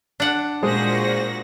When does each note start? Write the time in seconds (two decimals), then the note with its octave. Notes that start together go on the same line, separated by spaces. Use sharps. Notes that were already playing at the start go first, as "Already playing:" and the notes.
0.20 D4 F#5
0.63 A#2 G#3 F#4 G#4 C5 A#6